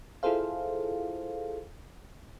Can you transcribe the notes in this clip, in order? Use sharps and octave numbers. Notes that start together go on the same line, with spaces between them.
E4 F4 G#4 A4 C5 F5